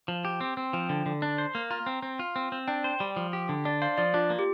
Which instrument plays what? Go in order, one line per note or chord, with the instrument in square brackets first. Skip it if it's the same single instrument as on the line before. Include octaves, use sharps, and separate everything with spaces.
[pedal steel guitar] F3
G4
C4
C4
[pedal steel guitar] F3 [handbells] G5
[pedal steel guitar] D3
D3
D4
C5
A#3
[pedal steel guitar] F4 [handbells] A#5
[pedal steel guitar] C4
C4
F4
C4
C4
[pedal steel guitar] D4 [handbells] G5
[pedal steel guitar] C5
G3
F3
G4
D3
[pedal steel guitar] D4 [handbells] D5
[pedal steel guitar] C5 [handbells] F5
[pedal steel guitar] F3 [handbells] D5
[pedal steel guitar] D4 [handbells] F4
[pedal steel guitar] A#3
[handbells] G4